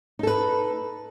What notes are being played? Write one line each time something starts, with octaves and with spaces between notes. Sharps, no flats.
D#4 A4 B4